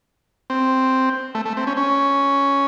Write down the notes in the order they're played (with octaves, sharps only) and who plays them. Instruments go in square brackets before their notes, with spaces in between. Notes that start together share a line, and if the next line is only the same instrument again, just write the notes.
[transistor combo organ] C4
A3
A3
C4
C#4
C#4